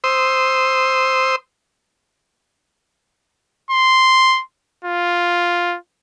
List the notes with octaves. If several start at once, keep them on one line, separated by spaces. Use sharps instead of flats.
C5 C6 D#6 E6
C6
F4